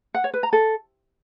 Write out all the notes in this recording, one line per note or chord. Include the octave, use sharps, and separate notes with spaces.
F#5
C#5
B4
A#5
A4